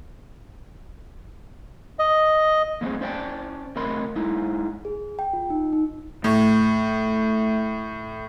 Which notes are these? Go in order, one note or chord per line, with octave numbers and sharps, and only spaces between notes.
D#5
A#2 F3 G#3 A3 C4
C#4 C5 D5 E5 G5 A5
C3 A3 A#4 D#5 B5 C6
G#3 D#4 E4
G#4
G5
F4
D#4
D#4
A2 A3